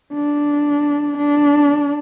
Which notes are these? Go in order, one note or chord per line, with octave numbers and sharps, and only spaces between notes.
D4
D4